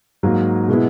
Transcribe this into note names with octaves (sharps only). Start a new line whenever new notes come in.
G#2 F#3 A#3
B2 G#3 B3 E4